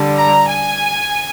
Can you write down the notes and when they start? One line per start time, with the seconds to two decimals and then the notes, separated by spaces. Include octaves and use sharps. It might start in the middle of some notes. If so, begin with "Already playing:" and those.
Already playing: D3 G3
0.16 A#5
0.47 G#5